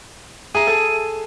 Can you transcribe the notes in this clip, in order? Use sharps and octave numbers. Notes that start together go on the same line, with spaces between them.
G#4 E5 A#5 D#7
G#4 A4